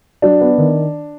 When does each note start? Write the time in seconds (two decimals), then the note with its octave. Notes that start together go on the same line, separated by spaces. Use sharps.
0.22 F#3 D4
0.41 B3
0.58 D#3